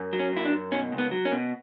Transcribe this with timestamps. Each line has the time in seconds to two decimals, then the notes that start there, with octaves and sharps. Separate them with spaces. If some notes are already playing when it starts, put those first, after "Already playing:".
Already playing: F#2
0.13 F#3
0.19 C#4
0.33 F#2 E4
0.45 D4
0.53 F#2
0.72 B2 C#4
0.92 C#2
0.98 B3
1.11 F#3
1.25 C#4
1.32 B2